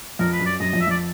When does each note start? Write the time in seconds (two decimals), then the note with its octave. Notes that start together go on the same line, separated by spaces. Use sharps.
0.19 F2 A#4
0.33 B4
0.40 F#2
0.46 D5
0.60 F#2 D#5
0.70 D#5
0.73 F2
0.81 E5
0.87 F2 D5